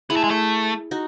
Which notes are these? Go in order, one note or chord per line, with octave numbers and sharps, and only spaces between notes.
B3 E4 G#4
A3
G#3
A3
D#4 F#4